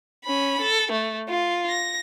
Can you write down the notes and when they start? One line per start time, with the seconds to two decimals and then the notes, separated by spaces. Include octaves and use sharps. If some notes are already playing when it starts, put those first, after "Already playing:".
0.25 C#4 B5
0.61 A4
0.92 A3
1.29 F4
1.70 A#6